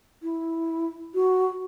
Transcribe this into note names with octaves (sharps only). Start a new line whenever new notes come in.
E4
F#4